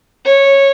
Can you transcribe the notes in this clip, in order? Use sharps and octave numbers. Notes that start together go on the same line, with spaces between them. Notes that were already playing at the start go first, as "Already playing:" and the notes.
C#5